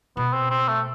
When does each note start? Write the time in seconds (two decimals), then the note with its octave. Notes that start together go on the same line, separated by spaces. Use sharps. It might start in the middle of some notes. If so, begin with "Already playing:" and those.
0.17 B2 B3
0.33 C4
0.50 C4
0.68 A3